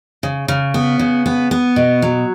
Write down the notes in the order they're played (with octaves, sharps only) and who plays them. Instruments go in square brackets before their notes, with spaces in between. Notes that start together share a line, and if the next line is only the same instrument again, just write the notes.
[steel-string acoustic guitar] C#3
C#3
B3
C#3
B3
B3
B2
F#3